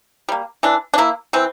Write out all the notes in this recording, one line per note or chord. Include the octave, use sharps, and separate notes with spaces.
G3 A#3
E3 D4
D4
A#3 E4
E3 C4